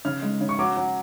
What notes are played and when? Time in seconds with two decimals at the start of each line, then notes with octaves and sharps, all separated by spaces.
0.05 C#3 F6
0.22 G#3
0.41 C#3
0.49 C#6
0.59 F#3 D6
0.77 F#3